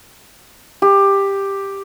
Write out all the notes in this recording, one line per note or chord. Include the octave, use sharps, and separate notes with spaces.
G4